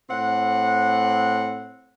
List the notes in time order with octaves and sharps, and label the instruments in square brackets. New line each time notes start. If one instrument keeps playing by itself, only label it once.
[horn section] A2 C4 F#5